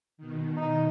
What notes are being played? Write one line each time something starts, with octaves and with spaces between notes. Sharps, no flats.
B2 D#3
D#4